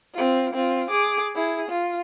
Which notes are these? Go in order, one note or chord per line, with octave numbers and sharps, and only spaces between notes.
C4 F4
C4 F4
G#4 D6
E4 G#4
F4